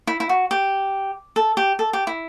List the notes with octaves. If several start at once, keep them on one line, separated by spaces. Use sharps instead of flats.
E4
E4
F#4
G4
A4
G4
A4
G4
E4